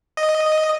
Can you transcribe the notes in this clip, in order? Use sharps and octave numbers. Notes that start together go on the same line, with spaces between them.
D#5